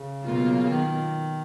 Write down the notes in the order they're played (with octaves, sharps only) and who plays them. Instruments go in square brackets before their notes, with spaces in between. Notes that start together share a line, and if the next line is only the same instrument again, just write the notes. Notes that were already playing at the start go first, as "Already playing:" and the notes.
Already playing: [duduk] C#3
[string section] B2 F#3 A#3 F4
[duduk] C#3
D#3